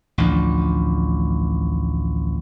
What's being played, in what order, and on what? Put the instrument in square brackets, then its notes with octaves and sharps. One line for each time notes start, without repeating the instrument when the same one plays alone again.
[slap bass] A1 D2 F3 D4